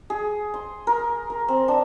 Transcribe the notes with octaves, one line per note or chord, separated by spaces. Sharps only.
G#4
C6
A#4
A#4
C4
D4